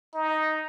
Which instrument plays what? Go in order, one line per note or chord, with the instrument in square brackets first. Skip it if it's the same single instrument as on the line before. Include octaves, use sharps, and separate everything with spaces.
[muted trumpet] D#4